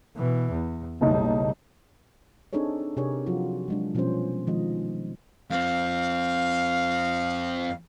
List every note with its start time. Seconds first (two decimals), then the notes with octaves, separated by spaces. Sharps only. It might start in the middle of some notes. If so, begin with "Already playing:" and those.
0.16 B2 E3
0.52 E2
1.01 F#1 B1 G3 D#4
2.53 C4 D4 D#4 G#4 A4 C#5
2.97 C3 D4 G4 G#4 A#4 C#5
3.26 F3 F#3 F4 F#4
3.68 F#3 G#3 D4
3.95 B2 F3 G3 B3 C#4 C5
4.47 D#3 F3 G#3 D#5
5.50 F2 C4 F5